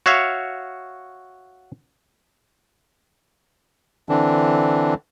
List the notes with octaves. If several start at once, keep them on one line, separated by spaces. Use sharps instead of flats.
F#4 C#5 E5 F5
D3 E3 C4 D4